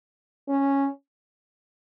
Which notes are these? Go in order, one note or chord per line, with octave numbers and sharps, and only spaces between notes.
C#4